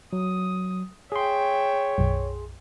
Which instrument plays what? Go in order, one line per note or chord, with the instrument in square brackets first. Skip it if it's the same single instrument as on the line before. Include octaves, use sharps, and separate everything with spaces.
[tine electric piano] F#3 [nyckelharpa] D#6
[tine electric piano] G#4 C6 [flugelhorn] C#5 [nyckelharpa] E5 G5
[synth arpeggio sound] B1 F#2